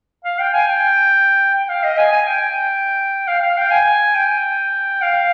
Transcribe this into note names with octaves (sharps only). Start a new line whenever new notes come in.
F5
G5
G#5
G5
G5
F5
D#5
G#5
G#5
G5
F5
F5
G5
G#5
G5
F5